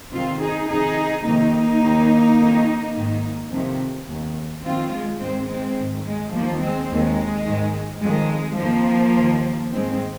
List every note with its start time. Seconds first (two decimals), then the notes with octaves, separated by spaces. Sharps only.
0.13 F2 C3 D#3 C4 F4
0.41 D#4 G#4
0.69 F2 C3 D#3 D#4 G#4
1.26 F2 C3 D#3 A#3 D#4
1.82 D#2 D#3
2.40 F2 D#3
2.96 G#2 D#3
3.51 F2 C3 D#3
4.09 D#2 D#3
4.65 F2 D#3 C4 F4
4.93 G#3
5.21 G#2 D#3 G#3 C4
5.49 G#3 C4
5.78 G#2 D#3
6.06 G#3
6.34 D#2 D#3 F3 A#3
6.62 G#3 C4
6.90 D#2 D#3 G#3
7.48 G#2 D#3
8.04 F2 D#3 G#3
8.59 F2 D#3 F3 A#3
9.16 D#2 D#3
9.73 G#2 D#3 G#3 C4